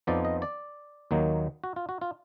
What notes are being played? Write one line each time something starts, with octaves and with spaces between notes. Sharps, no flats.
F2 F3 B3 D#4 D5
D#5
D5
D#2 D#3 F#3 A#3 D#4
F#4
F4
F#4
F4